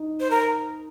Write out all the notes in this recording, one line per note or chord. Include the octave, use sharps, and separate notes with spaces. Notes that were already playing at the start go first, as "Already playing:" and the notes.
Already playing: D#4
C5
A#4